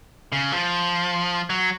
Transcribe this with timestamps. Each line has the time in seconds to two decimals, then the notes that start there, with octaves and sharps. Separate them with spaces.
0.32 C#3
0.52 F3
1.50 F#3